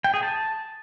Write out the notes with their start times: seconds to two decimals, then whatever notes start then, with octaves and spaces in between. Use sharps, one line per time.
0.04 G5
0.14 G#4
0.23 A5